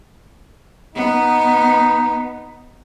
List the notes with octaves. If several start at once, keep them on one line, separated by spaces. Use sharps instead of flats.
B3 D#4